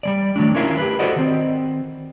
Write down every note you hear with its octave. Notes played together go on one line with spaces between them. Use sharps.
G3 G#3 D5
D#3 F#3 A3 D4
C#4 E4 F4 A#4 E5 F5
G4 B4
F#4 A4 C5 D5 D#5 F#5
D#3 C4